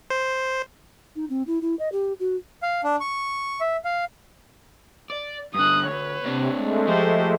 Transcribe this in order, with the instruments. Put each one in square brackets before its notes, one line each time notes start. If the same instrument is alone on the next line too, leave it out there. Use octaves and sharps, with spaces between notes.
[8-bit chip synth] C5
[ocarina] D#4
C4
E4
E4
D#5
G4
F#4
[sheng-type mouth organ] F5
D4
C#6
E5
F5
[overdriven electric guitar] D5
[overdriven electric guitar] G2 D3 [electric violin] D#6 F#6
[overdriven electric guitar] D2 [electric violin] B4 C#5
[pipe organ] C3 [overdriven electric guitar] C4 D4
[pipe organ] G#3 A3
[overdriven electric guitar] F3 [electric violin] G4 C5